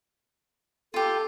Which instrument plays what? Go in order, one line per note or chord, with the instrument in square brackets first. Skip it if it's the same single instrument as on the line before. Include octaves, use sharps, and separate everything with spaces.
[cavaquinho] F4 G4 [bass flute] A4